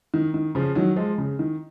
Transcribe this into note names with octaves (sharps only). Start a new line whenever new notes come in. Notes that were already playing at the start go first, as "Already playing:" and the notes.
D#3
D#3
C#3 F3
D#3 F#3
F3 G#3
C#3
D#3